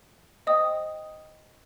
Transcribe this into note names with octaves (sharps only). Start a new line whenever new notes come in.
C5 D#5 G5 D#6